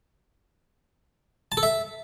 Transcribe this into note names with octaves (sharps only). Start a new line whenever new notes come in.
A5
A4
E5